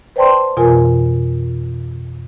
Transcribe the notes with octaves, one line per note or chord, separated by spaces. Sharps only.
B4 C5 D5 G5 A5 C6
F2 B2 E3 F4 A#4 G#5